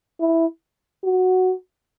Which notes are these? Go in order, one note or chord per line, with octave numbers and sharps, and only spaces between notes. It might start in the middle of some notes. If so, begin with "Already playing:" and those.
E4
F#4